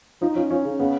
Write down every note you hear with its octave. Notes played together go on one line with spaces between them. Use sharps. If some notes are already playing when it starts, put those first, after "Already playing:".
F3 D#4
F3 C#4
F3 C#4
C#3
C#3 B3